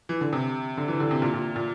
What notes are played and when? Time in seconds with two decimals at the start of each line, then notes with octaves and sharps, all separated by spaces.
0.09 E3
0.21 D3
0.33 C3
0.77 D3
0.88 E3
1.00 D3
1.11 C3
1.22 A#2
1.34 A#2
1.56 A#2